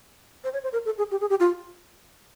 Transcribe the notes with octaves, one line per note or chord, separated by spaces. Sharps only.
C5
C#5
C5
A#4
A4
G#4
G4
G#4
G4
F4